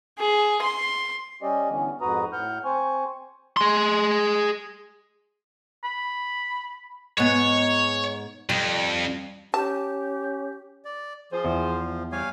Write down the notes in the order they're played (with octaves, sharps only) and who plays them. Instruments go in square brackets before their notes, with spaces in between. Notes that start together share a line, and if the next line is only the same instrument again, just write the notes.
[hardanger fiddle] G#4
C6
[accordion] G3 C#4 G4 D5 D#5
D3 E3 B3 C#4
F2 G#2 F#4 B4 A#5 D#6
A2 F#5 F6 G6
C4 C5 G#5 C#6
[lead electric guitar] G#4 C6
[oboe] B5
[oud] G#2 B3 [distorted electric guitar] C#5
[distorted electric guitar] F2 [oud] G3
[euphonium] C#4 [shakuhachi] G4 [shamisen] A5
[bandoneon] D5
[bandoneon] F3 [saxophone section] F4 G#4 C5
[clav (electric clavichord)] E2
[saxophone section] G3 [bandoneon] C#5 F5 G#5